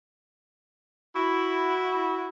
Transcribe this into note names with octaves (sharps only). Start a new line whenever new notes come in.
E4 F#4